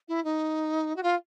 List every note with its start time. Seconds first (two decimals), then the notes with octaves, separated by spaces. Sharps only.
0.08 E4
0.24 D#4
0.96 F#4
1.03 F4